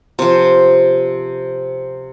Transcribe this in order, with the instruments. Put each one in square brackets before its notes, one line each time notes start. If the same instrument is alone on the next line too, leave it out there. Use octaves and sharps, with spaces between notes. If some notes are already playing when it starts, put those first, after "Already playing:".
[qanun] C3 F3